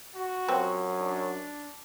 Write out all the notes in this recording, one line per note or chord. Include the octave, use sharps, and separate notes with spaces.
F#4
F#2 F3 G3 C4
D4